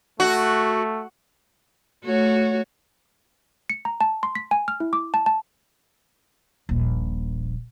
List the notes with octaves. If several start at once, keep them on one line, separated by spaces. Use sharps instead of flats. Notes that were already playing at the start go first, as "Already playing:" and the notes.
A3 F#4
A3 F#4 C#5
C#7
A#5
A5
C6
B6
G#5
F6
E4
D6
A5
A5
D#1 A#1